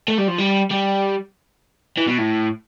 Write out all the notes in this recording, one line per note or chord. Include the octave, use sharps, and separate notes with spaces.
A3
G3
F3
G3
G3
E3
B2
A2